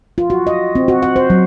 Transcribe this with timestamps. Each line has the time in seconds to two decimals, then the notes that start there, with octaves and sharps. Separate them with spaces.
0.18 F4
0.30 F#4
0.47 D#5
0.75 C4
0.88 F#4
1.03 F#5
1.16 C5
1.30 F#3